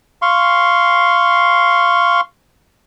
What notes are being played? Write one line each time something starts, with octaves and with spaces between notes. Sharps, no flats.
F5 C6 C#6